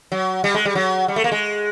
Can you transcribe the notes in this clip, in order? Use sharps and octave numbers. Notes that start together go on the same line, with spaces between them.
F#3
G3
G#3
G3
F#3
G3
A3
A#3
G#3